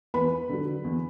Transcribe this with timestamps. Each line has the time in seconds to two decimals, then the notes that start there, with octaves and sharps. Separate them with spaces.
0.14 E2 B4 B5
0.49 D3 F#3
0.84 E2